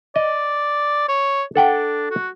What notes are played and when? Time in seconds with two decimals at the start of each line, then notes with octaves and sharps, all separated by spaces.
0.16 D5 D#5
1.09 C#5
1.56 D4 A4 F#5 G5
2.11 F#4